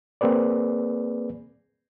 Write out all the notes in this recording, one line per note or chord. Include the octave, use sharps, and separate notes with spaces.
A#3 C4 G#4 B4 D5